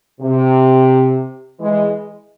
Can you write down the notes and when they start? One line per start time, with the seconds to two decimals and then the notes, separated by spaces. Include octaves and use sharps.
0.21 C3
1.60 E3 G#3